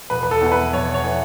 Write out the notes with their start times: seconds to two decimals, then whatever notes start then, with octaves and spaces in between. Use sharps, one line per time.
0.10 E1 B4
0.23 B4
0.31 A4
0.41 E2 E3
0.52 B4
0.73 E1 C#5
0.94 C#5
1.04 E3